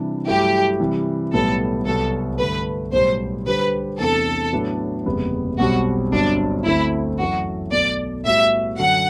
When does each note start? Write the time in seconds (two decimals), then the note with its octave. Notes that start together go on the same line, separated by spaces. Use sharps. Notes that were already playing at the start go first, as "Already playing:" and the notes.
Already playing: C3 E3 G3 D4
0.27 G2 F#3 A3 E4 G4
0.80 C3 E3 G3
1.33 B1 A2 G3 B3 A4
1.86 C2 C3 F#3 B3 F#4 A4
2.39 G2 D3 A3 B4
2.93 B1 A2 G3 B3 C5
3.46 D3 G3 D4 G4 B4 C5
3.99 E2 C3 E3 A3 D4 A4
4.52 A2 F#3 B3 D4
5.06 F#1 E2 C3 G3 B3
5.58 B1 B2 G3 C4 F#4
6.12 G1 G2 F#3 C4 D4
6.65 D2 D3 A3 C4 E4
7.19 F#2 E3 A3 F#4
7.72 B1 B2 A3 D5
8.25 A2 G3 B3 F#4 E5
8.78 F#2 D3 F#3 F#5